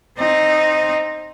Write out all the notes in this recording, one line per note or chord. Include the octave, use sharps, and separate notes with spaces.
C4 D#4